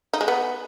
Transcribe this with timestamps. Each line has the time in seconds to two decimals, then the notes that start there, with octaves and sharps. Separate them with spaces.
0.13 D#4
0.21 G#3
0.28 B3